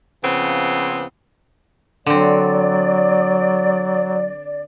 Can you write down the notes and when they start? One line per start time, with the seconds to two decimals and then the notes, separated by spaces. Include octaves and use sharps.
0.24 C#3 F3 B3 C4
2.06 D3 F#3 C4 D5